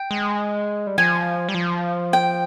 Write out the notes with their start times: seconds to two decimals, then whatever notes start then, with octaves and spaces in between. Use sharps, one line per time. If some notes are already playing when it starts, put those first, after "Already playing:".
Already playing: G5
0.11 G#3
0.87 G3
0.98 F3 G#5
1.49 G3
1.55 F3
2.13 G5